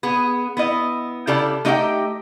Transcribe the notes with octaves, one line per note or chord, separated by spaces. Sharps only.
B3 G#4
B3 E4 D#5
C#3 E4 G4 A4 D5 A5
A3 D#4 G4 D#5 F5 G5